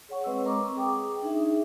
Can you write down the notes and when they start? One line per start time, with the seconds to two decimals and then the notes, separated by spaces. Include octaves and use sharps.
0.09 G#4 C#5 F#5 C#6
0.24 G#3 C4 B4 D#5 E6
0.45 C4 A#4 D#5 A#5 C#6 D6
0.76 G#4 G5 D6 D#6
1.22 D4 D#4 G#4 E5